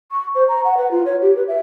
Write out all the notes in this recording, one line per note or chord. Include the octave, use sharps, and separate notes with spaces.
C#6
C5
A#5
F#5
B4
F4
C#5
G4
B4
E5